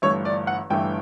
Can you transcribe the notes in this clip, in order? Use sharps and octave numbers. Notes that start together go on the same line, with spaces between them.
G1 G2 E3 A3 C#5
D5
F#5
G1 G2 E3 A3 G5